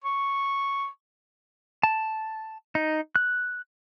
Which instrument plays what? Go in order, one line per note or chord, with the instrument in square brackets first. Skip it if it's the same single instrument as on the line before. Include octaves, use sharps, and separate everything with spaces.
[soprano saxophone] C#6
[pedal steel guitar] A5
D#4
F#6